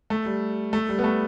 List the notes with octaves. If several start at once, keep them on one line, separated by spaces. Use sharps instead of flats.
A3
G3
A3
G3
B3
A3